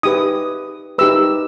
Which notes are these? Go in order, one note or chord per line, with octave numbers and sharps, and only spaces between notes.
D#4 G4 B4 D#6
D#4 G4 B4 E6